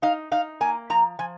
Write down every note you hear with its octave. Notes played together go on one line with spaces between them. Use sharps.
D#4 F5
D#4 F5
A#3 G#5
F3 A#5
F3 G#5